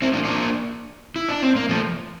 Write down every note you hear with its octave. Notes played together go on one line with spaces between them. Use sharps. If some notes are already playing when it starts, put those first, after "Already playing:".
C4 E4
A#3 D4
A#3 D4
E4
D4
C4
A#3
F3 A3